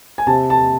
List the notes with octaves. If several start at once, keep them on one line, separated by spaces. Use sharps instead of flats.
G#5
C3 A5
A5